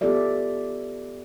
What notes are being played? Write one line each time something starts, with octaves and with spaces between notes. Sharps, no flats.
B3 F4 G4 A4 D5 E5